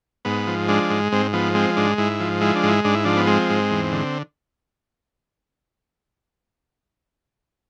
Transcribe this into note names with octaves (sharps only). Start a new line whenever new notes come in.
G#2 B3
F3
G#3 D4
G#2
G#2 C4
F3 B3
G#3 C4
G#2 D4
G#2 E4
F3
G#3 E4
D4
G#2
E4
G#2 D4
E4
F3 D4
B3
G#3 C4
G#2
E2
D3